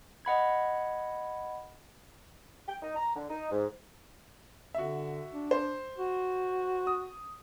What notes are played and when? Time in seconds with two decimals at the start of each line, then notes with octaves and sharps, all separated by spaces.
0.25 D#5 F#5 B5 G#6
2.68 G5
2.82 D#4
2.96 A#5
3.15 D3
3.29 D#4
3.51 G#2
4.75 D3 F#4 E5
5.34 D4
5.51 C5
5.98 F#4
6.87 D#6